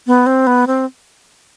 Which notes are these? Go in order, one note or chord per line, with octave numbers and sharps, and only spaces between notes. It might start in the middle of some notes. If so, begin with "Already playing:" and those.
B3
C4
B3
C4